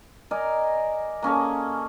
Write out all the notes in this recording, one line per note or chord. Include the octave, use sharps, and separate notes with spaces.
A#4 D5 D#5 G#5
A#3 C#4 G#4 A4